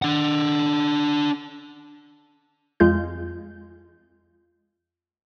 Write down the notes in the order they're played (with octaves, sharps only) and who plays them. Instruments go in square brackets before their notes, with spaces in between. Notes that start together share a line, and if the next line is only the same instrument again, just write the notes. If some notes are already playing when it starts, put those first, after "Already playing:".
[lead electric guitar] D4 F#5
[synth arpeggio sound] F2 G#3 F4 G6